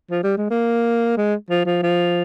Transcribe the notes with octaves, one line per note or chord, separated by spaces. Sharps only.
F3
G3
G#3
A#3
G#3
F3
F3
F3